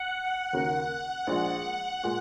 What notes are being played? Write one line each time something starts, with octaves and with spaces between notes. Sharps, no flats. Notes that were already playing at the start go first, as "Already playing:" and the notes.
Already playing: F#5
F#5
D#2 C#3 A#3 F#4 A#4 F#5
A#1 A#2 G#3
A#2 G#3